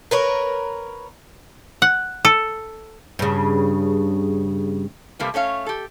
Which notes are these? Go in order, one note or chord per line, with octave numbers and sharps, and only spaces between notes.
A#4 B4 C#5
F#5
A4
G2 C#3
C3 G3 A3 A#3 B4
A3 C#4 C#5 F5
G4 A4